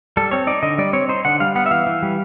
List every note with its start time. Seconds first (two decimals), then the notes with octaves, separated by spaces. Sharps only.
0.17 G3 A4
0.31 C4 C#5
0.47 D#4 D5
0.62 D3 D#5
0.78 G3 D5
0.93 C4 C#5
1.09 D#4 C5
1.25 D3 F#5
1.40 G3 F5
1.56 B3 F#5
1.66 E5
1.71 E3 F5
1.87 E3
2.03 G3